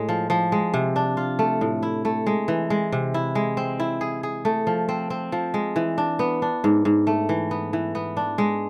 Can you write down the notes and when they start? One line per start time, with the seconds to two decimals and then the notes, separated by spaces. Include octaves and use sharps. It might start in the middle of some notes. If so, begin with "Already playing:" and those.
Already playing: A2 G#3
0.09 F3
0.30 F3
0.52 G#3
0.74 C3
0.96 D4
1.17 F4
1.39 A3
1.61 A2
1.83 E4
2.05 A3
2.26 G#3
2.48 E3
2.70 G#3
2.92 C3
3.14 E4
3.35 G#3
3.57 C4
3.80 E4
4.01 G#4
4.23 G#4
4.45 A3
4.67 F3
4.89 C4
5.10 C4
5.32 F3
5.54 G#3
5.76 E3
5.98 D4
6.19 B3
6.42 D4
6.64 G#2
6.85 G#2
7.07 A3
7.29 E3
7.51 B3
7.73 E3
7.95 B3
8.17 D4
8.38 G#3